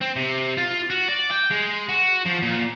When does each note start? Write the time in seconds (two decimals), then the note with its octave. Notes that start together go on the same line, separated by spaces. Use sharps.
0.01 C4
0.16 C3
0.57 F4
0.90 F#4
1.08 D5
1.31 G5
1.51 G#3
1.89 F#4
2.26 F3
2.42 A#2